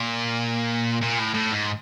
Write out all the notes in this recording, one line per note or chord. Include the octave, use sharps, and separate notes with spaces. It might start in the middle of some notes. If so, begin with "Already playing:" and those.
Already playing: A#2
A#2
A2
A2
G#2